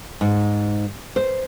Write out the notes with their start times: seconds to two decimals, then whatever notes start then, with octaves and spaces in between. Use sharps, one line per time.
0.21 G#2
1.16 C5